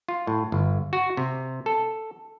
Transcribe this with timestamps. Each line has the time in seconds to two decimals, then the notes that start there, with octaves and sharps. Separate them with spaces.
0.08 F4
0.27 A2
0.52 G1
0.93 F#4
1.17 C3
1.66 A4